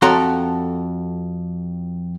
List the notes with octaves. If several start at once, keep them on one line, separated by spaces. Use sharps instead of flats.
F2 F#4 A4 C#5 A#5 C6